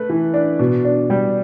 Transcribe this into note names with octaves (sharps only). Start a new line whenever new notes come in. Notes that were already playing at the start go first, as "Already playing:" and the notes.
Already playing: A3 B4
E3
D4
B2
D4
G3